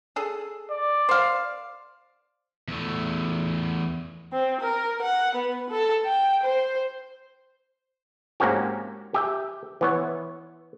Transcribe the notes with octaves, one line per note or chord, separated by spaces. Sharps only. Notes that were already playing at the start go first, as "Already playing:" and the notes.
G#4 A4
D5
C5 F5
E2 A3
C4
A#4
F#5
B3
A4
G5
C5
G#2 A#3 C4 C#4 F#4 G4
G4 E5 G5
E3 B3 C#5